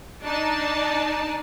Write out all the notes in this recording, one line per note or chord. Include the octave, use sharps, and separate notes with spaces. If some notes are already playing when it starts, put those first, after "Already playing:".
D4 D#4 D5 A5